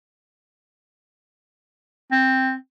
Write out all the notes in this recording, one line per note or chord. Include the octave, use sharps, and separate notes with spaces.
C4